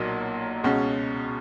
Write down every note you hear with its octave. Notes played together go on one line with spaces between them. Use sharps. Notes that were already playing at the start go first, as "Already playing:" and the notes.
Already playing: B1 A#2 F#3 A#3 D#4
C#2 B2 G#3 C#4 F#4